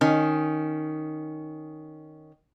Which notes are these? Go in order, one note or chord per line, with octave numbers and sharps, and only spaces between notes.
D#3 C#4